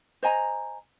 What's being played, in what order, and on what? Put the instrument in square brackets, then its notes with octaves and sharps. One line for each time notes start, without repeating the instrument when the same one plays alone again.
[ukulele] C5 D#5 G#5 A#5